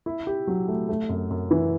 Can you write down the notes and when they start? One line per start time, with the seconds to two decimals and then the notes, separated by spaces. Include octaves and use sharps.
0.06 E4
0.27 G4
0.47 F#3
0.68 A3
0.89 A3
1.09 F#2
1.31 F#2
1.51 E3